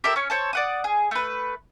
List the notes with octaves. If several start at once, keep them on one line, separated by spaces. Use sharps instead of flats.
G4 A4 A#4 E5
C#4 C#5
A4 C5 C#5
D5 F#5 D#6
G#4
A3 B4